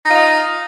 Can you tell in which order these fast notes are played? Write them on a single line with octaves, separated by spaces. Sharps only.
D#4 F4 D#5 F5